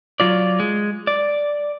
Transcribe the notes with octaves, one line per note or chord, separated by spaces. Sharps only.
F#3 F4 D5
G#3
D5